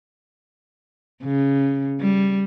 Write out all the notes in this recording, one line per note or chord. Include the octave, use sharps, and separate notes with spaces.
C#3
G3